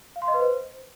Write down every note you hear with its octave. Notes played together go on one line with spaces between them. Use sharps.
F5
C6
D#5
B4
C5